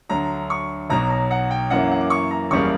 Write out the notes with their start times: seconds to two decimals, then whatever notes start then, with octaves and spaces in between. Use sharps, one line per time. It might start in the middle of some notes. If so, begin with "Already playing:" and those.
0.09 D2 D3 F#3 A#5
0.50 C#6
0.90 B1 B2 F#3 A#5
1.10 A#5
1.31 F#5
1.51 G5
1.70 F#2 E3 A#3 C#4 F#5
1.91 F#5
2.01 D6
2.10 C#6
2.31 A#5
2.51 F#1 E2 C#3 G3 A#3 C#6